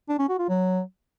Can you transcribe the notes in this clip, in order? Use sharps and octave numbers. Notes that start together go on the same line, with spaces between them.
D4
C#4
F#4
F4
F#3